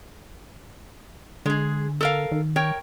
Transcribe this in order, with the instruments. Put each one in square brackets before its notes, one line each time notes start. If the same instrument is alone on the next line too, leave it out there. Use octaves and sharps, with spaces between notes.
[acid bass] D3 [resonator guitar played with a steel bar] G#3 G#4
[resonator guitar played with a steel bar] A4 A#4 F5
[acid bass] D#3
[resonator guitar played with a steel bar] A#4 C#5 G5